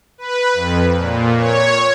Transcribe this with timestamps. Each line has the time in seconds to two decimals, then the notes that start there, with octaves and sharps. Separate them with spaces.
0.18 B4
0.54 F2
0.95 A#2
1.36 C#5